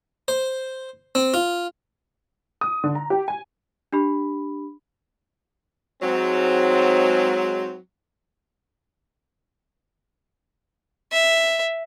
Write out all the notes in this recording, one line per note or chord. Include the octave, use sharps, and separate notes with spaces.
C5
C4
F4
D#6
D3
A#5
G4
G#5
D4 G4 B5
G#2 F#3 C4
E5